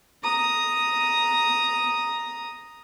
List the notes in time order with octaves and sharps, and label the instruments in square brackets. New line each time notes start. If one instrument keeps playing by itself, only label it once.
[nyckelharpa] A#5 D#6